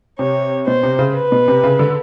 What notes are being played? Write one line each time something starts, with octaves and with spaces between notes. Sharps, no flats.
C3 C#5
B2 C5
C3
C#3
B4
B2
C3
C#3
D3